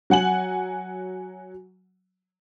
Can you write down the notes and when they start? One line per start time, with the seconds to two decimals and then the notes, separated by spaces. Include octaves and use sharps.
0.10 F#3 F#5 G#5 F#7